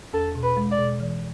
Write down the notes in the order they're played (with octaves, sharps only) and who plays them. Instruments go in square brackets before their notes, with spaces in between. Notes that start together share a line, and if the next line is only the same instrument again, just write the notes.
[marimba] E2 [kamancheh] A4
[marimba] B2
[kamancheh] B4
[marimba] G#3
[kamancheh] D5
[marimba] B2
E3